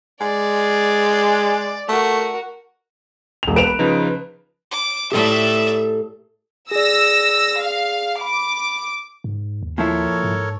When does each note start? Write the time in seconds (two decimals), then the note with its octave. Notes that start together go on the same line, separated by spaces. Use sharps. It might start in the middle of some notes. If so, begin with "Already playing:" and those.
0.21 G#3 D5
1.88 A3 F#4 A#4
3.43 E1 F7
3.56 B4 D7 E7 F7
3.79 C#3 F3 D#4
4.71 D6
5.12 A2 G4 A4 D5 E5
6.71 G#4 D5 E6 A#6
7.59 F5
8.21 B5 D6
9.24 G#2
9.63 D#2
9.78 A#2 F3 E4 A4 A#4 C#5
10.24 G#2